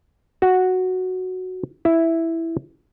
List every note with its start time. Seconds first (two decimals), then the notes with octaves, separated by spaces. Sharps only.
0.42 F#4
1.85 E4